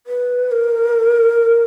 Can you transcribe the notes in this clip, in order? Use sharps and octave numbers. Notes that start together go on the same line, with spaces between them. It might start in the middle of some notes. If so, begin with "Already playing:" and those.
B4
A#4